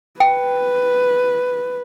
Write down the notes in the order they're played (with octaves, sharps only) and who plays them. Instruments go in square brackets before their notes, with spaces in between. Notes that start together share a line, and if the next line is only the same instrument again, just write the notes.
[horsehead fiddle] B4 [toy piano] G5